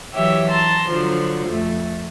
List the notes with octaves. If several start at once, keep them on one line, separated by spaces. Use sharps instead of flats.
E3 F#3 G4 C#5 E5
A5 A#5 C6
D3 F3 F#3 C5
F2 A3